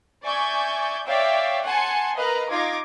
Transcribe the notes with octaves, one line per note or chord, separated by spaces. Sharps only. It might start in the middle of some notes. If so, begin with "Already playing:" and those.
D5 E5 G#5 C#6 G6 G#6
C#5 D5 E5 F5 G5
F#5 G#5 A5 C6 C#7
A#4 B4 D#5 F5 A#5 F#6
D#4 F4 D6 G#6 A#6